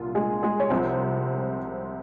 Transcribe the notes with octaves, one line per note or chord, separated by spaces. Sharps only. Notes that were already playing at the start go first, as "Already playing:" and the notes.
Already playing: C2 A#2 F4
G#3 G#4
G#3 G#4
C#5
C2 C3 F3 C4 C5